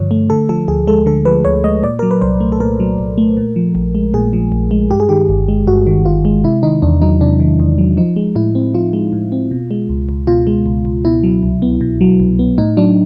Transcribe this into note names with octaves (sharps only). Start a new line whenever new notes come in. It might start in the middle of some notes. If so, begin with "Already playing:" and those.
Already playing: G2 D3 F3 C#5
A3
D3 A4
F3 A4
D2 G#4
G#3 A4
D3 A4
F3 B4
D2 C#5
G#3 D#5
A#2 D5
F#3 A#4
B4
C2 C5
A3
A4
A#2 A#4
F#3
C2
A3
A#2
F3
A#1
G#3
A#2 G#4
F3
A#1
G#3
G2 G4
G#4
D#3 G4
G1
G#3
G2 F#4
D#3
G1 F4
G#3
C3 E4
D#3 D#4
E2 D4
F#3 D#4
C3 D4
D#3
E2
F#3
F3 D#4
G#3
A2 E4
C4
F3 F4
G#3
A2
C4
B2
G#3
C#2
C#2
B2 F4
G#3
C#2
C#2
B2 E4
F#3
C2
B3
B2
F#3
C2
B3
A2 D#4
F#3 D4